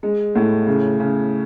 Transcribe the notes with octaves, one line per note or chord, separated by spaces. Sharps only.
G#3
A2
C#3
C#3